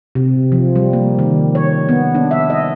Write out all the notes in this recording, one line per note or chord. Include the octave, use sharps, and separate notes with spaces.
C3
F3
G3
A#3
D#3
C#5
B3
D4
E5
D#5